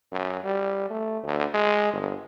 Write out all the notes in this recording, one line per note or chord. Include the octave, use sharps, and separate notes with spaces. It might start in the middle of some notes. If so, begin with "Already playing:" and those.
F#2
G3
A3
D2
G#3
G1